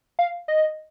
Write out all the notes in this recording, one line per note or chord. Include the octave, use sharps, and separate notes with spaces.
F5
D#5